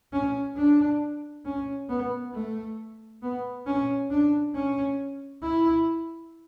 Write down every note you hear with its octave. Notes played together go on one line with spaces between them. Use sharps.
C#4
D4
C#4
B3
A3
B3
C#4
D4
C#4
E4